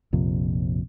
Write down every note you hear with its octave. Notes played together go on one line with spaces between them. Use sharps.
A#1 F2 C3